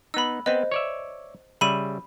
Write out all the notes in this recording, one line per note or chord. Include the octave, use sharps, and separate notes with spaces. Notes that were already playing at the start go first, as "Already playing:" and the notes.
B3 D#4 B5 E6
B3 C4 B4 C5 D#5
C#5 D5 E5
C#3 G3 E5 B5 D#7